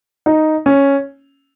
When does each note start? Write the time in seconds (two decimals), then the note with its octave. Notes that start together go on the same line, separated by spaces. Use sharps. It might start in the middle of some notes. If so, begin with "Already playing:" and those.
0.26 D#4
0.66 C#4